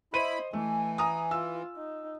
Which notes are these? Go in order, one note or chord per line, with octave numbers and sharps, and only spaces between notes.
E4 C5 D#5 B5 D#7
E3 A3 G#5
G#5 A#5 D#6
F4 E6
D#4